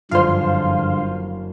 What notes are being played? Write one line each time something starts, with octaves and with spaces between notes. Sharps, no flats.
F#1 G2 D3 F3 F4 C5 F5 C6